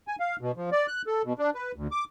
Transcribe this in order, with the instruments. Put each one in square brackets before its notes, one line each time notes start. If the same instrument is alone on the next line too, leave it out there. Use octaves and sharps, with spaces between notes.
[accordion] G#5
F5
B2
F3
D5
F#6
A4
B2
D4
B4
D2
D6